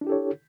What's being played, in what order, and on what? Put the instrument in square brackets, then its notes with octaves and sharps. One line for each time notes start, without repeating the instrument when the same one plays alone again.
[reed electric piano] D4
E4
G4
A4
C#5